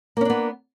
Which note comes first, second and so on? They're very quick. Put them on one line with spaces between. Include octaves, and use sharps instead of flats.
A#3 C#4 D4 B3